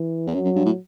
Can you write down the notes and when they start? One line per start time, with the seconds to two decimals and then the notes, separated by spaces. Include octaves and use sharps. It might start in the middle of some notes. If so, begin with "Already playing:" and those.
Already playing: E3
0.27 E2
0.34 F#2 F#3
0.45 F#2
0.56 G2
0.66 A2